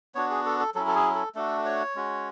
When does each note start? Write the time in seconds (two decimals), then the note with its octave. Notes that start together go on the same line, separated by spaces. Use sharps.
0.15 B3 D4 F#4 C#5
0.30 G#4
0.46 A4
0.60 A4
0.75 F#3 C#4 E4 A4
0.87 A4
0.95 G#4
1.15 A4
1.35 A3 D4 F#4 A4
1.66 C#5
1.95 G#3 C#4 F#4